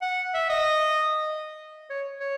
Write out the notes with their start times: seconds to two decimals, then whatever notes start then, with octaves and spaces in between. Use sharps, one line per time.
0.02 F#5
0.34 E5
0.49 D#5
1.90 C#5
2.20 C#5